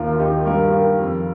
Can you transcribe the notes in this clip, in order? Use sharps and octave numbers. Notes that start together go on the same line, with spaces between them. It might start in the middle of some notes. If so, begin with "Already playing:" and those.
Already playing: D#2 D#3 F4 A#4
F4
D#3 D#4 G4
G2 F4 A#4
G4
D#3 F4 A#4
F2